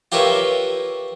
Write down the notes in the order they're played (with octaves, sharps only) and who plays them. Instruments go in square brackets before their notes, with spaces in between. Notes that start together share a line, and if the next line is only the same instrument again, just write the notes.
[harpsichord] F4 G4 A#4 B4 C#5 E5